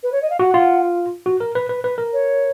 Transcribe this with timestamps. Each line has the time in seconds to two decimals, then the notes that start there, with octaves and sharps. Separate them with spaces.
0.02 B4
0.12 C#5
0.21 D#5
0.30 F5
0.39 F#4 F#5
0.54 F4
1.26 F#4
1.40 A#4
1.55 B4
1.69 B4
1.84 B4
1.98 A#4
2.13 C#5